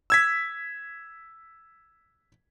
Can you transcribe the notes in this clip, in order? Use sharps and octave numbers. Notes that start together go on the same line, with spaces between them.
E6 G#6 B6